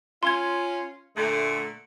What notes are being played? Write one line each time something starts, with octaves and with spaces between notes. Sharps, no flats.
C#4 F4 C6 G#6
A#2 D3 A3